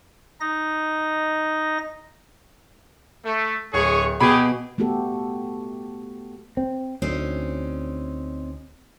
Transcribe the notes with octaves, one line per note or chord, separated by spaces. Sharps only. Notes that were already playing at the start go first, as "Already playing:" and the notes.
D#4 D#5 A#6
A3
D1 G#4 C#5 C#6
B2 G4 G#4 B5
A3 B3 F#4 G4 A4
C4
D2 C4 C#4 D#4